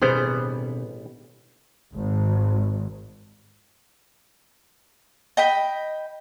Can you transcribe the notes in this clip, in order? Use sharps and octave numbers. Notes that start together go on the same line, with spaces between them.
A1 B2 G3 B3 C4 D4 G#4 C5
G#1
D#5 G5 B5